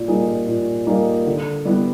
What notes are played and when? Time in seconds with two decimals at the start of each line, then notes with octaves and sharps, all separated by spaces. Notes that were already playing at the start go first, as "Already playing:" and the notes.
Already playing: A#2
0.08 G3 A#3 D#4 G#4
0.47 A#2
0.87 G3 A#3 D#4 G#4
1.26 D3
1.65 G3 B3 E4